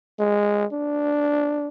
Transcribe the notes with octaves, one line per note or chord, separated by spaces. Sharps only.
G#3
D4